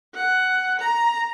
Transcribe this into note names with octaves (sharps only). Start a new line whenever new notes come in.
F#5
A#5